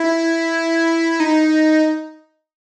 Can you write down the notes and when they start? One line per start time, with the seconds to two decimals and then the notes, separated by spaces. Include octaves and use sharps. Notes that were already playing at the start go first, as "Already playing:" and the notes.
Already playing: E4
1.20 D#4